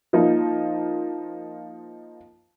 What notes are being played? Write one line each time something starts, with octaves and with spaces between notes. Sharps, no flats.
F3 A#3 D#4